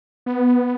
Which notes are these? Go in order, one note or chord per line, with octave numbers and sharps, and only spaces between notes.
B3